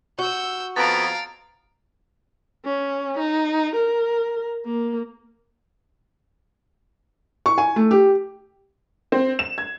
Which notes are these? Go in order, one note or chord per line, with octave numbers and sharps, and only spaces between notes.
F#4 E6 G6
F2 F3 B3 F5 A#5 A6 D7
C#4
D#4
A#4
A#3
C#6
G#5
A3
G4
C4
E7
G#6